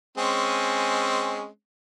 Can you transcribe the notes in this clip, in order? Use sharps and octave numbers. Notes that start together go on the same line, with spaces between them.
G#3 C4 C#4